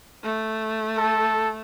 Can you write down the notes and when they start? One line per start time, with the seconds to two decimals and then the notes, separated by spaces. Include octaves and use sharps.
0.23 A3
0.97 A4